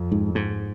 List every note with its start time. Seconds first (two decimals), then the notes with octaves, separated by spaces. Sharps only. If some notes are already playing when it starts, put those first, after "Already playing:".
Already playing: F2
0.12 G#2
0.35 G#2